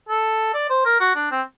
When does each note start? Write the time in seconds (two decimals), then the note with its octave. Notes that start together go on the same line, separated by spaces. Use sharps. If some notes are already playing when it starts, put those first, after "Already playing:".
0.09 A4
0.54 D5
0.70 C5
0.85 A#4
1.00 F#4
1.16 D4
1.31 C4